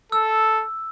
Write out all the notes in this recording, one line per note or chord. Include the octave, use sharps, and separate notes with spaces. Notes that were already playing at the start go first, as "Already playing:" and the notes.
A4 E6